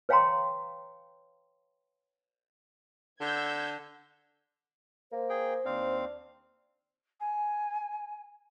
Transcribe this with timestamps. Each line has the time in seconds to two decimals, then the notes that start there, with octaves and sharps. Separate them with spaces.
0.09 B4 C#5 F5 G5 A#5 C6
3.21 D3 E6 G6 G#6
5.12 A#3 C5
5.29 G#4 G5
5.65 D#2 C4 D4 F5
7.20 G#5